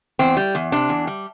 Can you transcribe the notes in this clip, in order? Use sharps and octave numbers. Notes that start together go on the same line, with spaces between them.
E2 C4
G3
E2
C3 D4
E2
G3